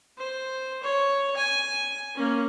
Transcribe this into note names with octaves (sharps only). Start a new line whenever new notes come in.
C5
C#5
G#5
A#3 C#4